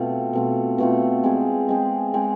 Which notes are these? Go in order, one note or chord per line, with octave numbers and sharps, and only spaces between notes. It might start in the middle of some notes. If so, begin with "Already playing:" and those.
Already playing: B2 A3 C4 F4
B2 A3 C4 F4
B2 A3 C4 F4
G#3 C4 G#4
G#3 C4 G#4
G#3 C4 G#4